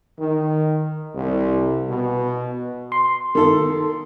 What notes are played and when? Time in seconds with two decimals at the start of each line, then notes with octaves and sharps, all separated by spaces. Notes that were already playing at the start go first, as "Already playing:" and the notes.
0.19 D#3
1.15 C2
1.89 B2
2.92 C6
3.35 D#3 A4